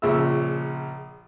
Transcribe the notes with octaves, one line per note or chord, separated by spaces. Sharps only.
A#1 C#3 F3 E5 E6